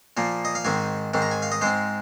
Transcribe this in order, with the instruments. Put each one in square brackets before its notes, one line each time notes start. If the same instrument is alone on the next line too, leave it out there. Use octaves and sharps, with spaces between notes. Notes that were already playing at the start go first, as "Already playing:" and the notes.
[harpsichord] A#2 F3 A#3
D#5
F5
G#2 D#3 C4 G#5
G#2 D#3 C4
A#5
G#5
F5
D#5
G#2 G#3 C4 C5